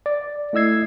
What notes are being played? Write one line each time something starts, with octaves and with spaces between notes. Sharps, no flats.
D5
A3 E4 D#5 E6 G#6 C7